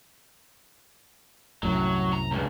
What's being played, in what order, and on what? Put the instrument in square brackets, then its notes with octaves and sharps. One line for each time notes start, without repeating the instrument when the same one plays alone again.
[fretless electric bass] C2 F#2 A2 [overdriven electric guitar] F#3
[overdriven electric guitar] A#5
C#2 G2